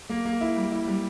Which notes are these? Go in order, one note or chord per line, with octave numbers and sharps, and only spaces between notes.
A#3
A#3
E4
G3
E4
G3